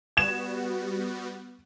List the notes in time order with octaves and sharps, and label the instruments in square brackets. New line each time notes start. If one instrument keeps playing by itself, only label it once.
[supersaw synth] G3 B3 F#4 [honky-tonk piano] G#6 E7